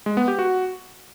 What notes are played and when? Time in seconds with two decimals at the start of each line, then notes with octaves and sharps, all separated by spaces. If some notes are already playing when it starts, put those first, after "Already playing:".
0.06 G#3
0.17 B3
0.28 G4
0.39 F#4